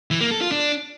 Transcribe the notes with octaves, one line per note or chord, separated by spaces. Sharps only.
E3
A#3
A4
F4
D4